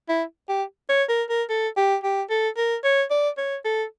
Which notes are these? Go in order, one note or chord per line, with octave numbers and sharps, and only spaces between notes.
E4
G4
C#5
A#4
A#4
A4
G4
G4
A4
A#4
C#5
D5
C#5
A4